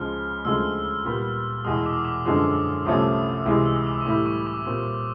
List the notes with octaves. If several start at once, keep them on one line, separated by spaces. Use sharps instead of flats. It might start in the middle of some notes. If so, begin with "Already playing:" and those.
Already playing: C#2 C#3 F3 G#3 F6
D2 C#3 F3 G#3 E6
A#2 G3 B3
E2 B2 G#3 D#6
D6
D6
F#2 D3 F3 G#3
C2 C3 F3 A3 C#4 D#6
C#2 C3 E3 G#3 D#6
E6
D#6
D6
C#6
A2 E3 G3 D6
C#6
D6
A#2 G3 C4